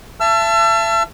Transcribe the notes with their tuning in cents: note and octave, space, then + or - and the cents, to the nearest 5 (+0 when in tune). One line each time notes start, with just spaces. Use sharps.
E5 +35 A5 +0 E6 +40